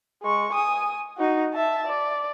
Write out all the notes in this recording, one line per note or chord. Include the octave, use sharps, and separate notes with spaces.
G#3 C#6
G#5 D#6
D#4 F#4
E5 A5
D5